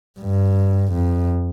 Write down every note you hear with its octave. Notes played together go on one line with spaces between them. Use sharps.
G2
F2